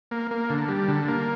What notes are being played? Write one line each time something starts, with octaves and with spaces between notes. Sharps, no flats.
A#3
A#3
D3
G3
D3
A#3